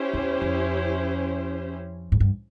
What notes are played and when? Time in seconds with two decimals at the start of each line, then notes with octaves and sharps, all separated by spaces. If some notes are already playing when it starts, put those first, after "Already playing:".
Already playing: C#4 E4 G4 C5
0.14 E2
0.42 F2
2.12 G#2
2.20 G2